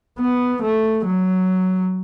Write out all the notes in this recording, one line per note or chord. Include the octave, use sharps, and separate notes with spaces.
B3
A3
F#3